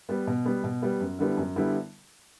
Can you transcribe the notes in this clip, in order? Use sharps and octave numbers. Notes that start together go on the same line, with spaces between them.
G3 B3
B2
G3 B3
B2
G3 B3
F#2
D3 G3 B3 E4
F#2
D3 G3 B3 E4